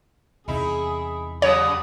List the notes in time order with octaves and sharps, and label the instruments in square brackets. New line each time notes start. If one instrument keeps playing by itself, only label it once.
[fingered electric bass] E2 C3 C4 [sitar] D#4 E4 [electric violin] G#4
[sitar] C#3 F#3 G3 [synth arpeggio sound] C#5 [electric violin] D5 D#6